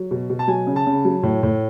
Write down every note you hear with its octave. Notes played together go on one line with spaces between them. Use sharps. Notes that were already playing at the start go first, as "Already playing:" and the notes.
Already playing: F#3
B2
B2
A5
F#3 G#5
C#3
A5
C#3
F#3
A2
A2